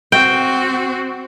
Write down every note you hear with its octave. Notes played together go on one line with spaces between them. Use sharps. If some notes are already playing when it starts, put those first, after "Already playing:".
C4 F#4 G5